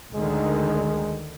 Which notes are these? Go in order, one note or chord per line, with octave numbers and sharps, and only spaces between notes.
D2 D3 D#3 G#3